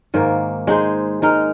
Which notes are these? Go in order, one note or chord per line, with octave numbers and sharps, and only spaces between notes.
G#2 D#3 A#3
G#3 D#4 G#4 C5
G#3 D#4 A#4